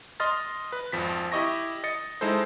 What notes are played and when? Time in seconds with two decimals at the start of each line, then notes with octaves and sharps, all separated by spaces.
0.20 D#5 C6 F6 A6
0.72 B4
0.92 G#1 F2 F3 B6
1.32 E4 G4 D#5 C#6 A#6
1.84 D#5 A6 C#7
2.21 G#3 D#4 E4 A4 C5